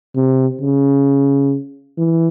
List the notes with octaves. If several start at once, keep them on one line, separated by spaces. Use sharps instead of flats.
C3
C#3
E3